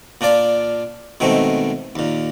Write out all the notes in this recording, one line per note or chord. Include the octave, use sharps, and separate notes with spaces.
A#2 D4 F4 D5
B2 D#3 G#3 A3 C4
D#2 A#2